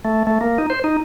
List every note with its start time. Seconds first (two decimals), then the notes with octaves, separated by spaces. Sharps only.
0.05 A3
0.27 A3
0.41 A#3
0.58 D#4
0.70 C5
0.84 D#4